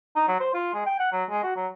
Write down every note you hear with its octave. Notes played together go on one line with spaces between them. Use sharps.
D#4
F#3
C5
F4
G#3
G5
F#5
F#3
G#3
F#4
F#3